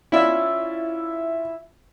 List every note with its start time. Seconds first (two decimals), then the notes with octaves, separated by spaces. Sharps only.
0.12 C#4 E4 F4 D5 E5